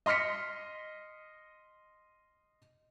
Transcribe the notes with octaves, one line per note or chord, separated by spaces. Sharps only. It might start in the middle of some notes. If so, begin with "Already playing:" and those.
D#5 C6 F6 B6 C#7